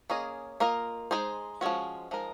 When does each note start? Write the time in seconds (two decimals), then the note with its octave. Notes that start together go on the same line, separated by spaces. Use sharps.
0.10 A#3 C#4 G#4 D#5
0.60 A#3 F4 A#4 D#5
1.11 G#3 D#4 G#4 C5
1.61 F3 G#3 C#4 F#4
2.11 F3 G#3 D#4 A#4